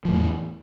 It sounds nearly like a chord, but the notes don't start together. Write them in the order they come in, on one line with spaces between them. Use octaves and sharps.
F3 A2 E2 E3